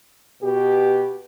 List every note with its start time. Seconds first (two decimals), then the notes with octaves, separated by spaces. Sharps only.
0.43 B2 G4